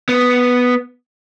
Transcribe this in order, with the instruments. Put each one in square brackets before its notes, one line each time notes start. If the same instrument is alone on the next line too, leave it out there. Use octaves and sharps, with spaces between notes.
[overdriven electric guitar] B3